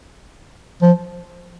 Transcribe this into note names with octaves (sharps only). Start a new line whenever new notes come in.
F3